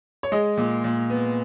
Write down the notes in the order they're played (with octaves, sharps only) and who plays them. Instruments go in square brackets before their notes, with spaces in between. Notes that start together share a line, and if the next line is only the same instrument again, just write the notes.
[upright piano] C#5
G#3 D#5
A#2
A#2
B3